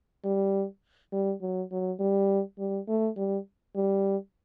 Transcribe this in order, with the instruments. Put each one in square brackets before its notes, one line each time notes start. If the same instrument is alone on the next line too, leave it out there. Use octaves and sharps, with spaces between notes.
[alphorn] G3
G3
F#3
F#3
G3
G3
A3
G3
G3